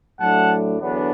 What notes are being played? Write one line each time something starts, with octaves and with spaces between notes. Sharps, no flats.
A2 F#3 A3 D4 F#5 A5
E2 D3 F#3 B3 D4